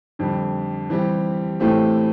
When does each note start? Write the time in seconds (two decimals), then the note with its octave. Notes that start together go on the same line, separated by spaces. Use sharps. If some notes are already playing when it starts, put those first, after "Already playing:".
0.19 F2 D3 G3
0.90 E3 G3 C4 G4
1.60 A2 E3 A3 C4 G4